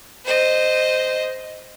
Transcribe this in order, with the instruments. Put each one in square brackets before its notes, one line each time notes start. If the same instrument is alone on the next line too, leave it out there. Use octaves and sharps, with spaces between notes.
[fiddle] C5 D#5